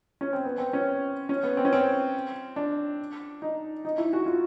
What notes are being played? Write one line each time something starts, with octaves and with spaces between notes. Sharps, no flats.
C#4
C4
B3
C4
C#4
C#4
B3
C4
C#4
C4
D4
D#4
D#4
E4
F#4
F4